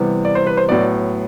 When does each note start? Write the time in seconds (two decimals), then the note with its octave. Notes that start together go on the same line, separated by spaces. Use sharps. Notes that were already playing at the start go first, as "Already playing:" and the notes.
Already playing: C3 E3 G3 B3
0.25 D5
0.35 C5
0.47 B4
0.57 C5
0.68 A2 F#3 B3 D5